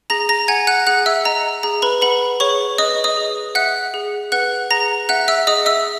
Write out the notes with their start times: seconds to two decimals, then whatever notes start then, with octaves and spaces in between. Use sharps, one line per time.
0.10 G#4 A#5 A#6
0.29 A#5 A#6
0.48 F#5 G#5 G#6
0.67 F#5 F#6
0.87 G#4 F#5 F#6
1.06 E5 E6
1.25 D#5 A#5
1.63 G#4 A#5
1.82 B4 B5
2.02 B4 F#5 B5
2.40 G#4 C#5 C#6
2.78 B4 D#5 D#6
3.04 D#5 D#6
3.17 G#4
3.55 E5 F#5 F#6
3.94 G#4
4.32 B4 F#5 F#6
4.71 G#4 A#5 A#6
5.09 E5 F#5 F#6
5.28 E5 E6
5.47 G#4 D#5 D#6
5.66 E5 E6